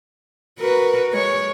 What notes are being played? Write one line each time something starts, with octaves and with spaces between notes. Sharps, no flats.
F#4 A#4 B4
G#3 C#5